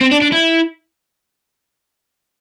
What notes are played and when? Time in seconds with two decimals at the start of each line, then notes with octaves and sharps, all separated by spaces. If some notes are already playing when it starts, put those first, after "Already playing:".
0.01 C4
0.11 D4
0.22 D4
0.32 E4